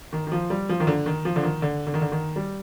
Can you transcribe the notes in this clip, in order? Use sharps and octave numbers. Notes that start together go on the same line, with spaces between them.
D#3
D#3
F3
G3
F3
D#3
D3
D#3
F3
D3
D#3
D3
D3
D#3
D3
D#3
G3